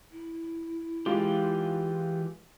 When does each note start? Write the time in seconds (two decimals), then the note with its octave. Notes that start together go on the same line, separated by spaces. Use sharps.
0.12 E4
1.06 E3 G#3 F4 G4